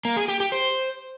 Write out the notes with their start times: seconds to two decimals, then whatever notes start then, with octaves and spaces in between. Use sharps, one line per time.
0.05 A#3
0.17 G#4
0.28 G4
0.40 G4
0.52 C5